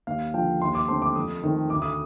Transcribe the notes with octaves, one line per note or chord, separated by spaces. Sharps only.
D#2 F5
D3 F3 G5
D#2 C6
D6
D3 A3 C4 C6
D6
F2 D#6
D#3 A3 C4
D2 D6
D#6